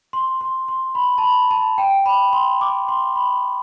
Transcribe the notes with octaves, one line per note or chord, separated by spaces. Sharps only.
C6
C6
C6
B5
A5
B5
A5
G5
B5
C6
D6
C6
B5